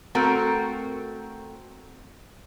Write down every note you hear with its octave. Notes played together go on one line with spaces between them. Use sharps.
A3 C4 F#4 A4 A#4